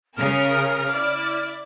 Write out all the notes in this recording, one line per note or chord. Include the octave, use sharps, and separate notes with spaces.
C#3 A#4 F6
E4 D5